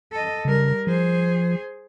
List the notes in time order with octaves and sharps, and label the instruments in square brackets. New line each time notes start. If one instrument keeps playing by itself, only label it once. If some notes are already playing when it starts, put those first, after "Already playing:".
[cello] A4 D#5
[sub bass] C#3 [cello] G3 A#4
[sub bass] F3 [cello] G#4 C5